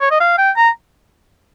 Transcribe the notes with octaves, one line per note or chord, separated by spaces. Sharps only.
C#5
D#5
F5
G5
A#5